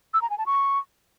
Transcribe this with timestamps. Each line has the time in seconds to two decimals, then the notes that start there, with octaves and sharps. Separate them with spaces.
0.14 E6
0.22 A#5
0.30 G#5
0.38 A5
0.46 C#6